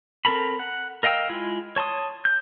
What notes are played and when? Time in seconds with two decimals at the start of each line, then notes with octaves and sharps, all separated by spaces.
0.25 C4 A4 A#4 A#5 B5
0.59 F#5
1.03 A#4 D#5 F5 G5 E6
1.29 G#3 E4 F4
1.76 C#5 A5 C6 D#6
2.25 G6